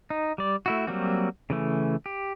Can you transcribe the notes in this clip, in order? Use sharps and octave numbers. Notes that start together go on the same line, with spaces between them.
D#4
G3 D5
A3 E4 F#4
F#3 G3 A#3 C4 F#4
C#3 E3 A3
G4